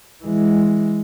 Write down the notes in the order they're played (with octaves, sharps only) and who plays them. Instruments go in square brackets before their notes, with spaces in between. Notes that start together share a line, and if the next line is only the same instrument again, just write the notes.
[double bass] E3 G#3